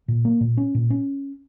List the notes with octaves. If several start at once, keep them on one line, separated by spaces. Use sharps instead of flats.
A#2
A#3
A#2
C#4
A#2
C#4